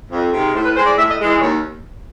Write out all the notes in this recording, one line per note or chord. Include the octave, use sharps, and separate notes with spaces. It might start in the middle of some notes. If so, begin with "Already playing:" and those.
F2
C3 D#3 G#3
A2 C5
B4
E3 G#3 C5
D5
A2 E5
D#5
E3 G#3
D#5
D#2 C#5